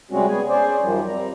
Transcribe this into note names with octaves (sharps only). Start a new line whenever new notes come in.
C3 G3 G#3 C4 C#4 F#4
B3 G#4 G#5
C#4 G#4 C5 D5
F#2 D#3 F3 G3
G3 C4 A#5